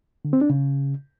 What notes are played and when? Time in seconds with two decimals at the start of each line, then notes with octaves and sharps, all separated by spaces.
0.25 D3
0.33 C4
0.41 D4
0.50 C#3